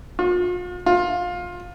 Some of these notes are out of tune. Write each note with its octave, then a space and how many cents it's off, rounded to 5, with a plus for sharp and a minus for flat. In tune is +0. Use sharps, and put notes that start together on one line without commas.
F4 +40
F4 +20